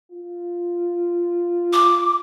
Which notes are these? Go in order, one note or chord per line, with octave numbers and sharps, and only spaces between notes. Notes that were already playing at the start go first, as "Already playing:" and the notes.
F4
D6